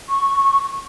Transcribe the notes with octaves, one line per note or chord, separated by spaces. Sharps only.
C#6